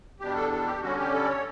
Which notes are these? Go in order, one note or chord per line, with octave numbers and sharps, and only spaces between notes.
E2 B2 G3 D4 G4
A4
A4
G4
D3 G3 C#4 F#4
G4
A4
D5
C#5